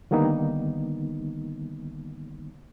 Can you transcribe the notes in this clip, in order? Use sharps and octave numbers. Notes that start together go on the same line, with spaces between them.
D3 D#3 G3 A#3 B3 D#4